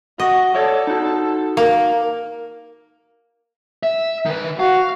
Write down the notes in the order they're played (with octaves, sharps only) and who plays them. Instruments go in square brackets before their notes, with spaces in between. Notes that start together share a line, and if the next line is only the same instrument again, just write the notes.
[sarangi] F#4 [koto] D#5
[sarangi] A4 [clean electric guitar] C#5 D5 E5
[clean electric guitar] D#4 F#4
[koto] A#3
[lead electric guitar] E5
D#3 B4
[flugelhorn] F#4 [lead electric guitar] F5